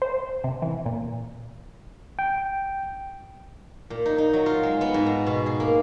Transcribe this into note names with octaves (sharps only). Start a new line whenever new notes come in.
C5
C3
E3
A#2
G5
A#2
D#4
D#4
F#3
F4
G#3
B3
G#2
A#5
B2
G#4
A#3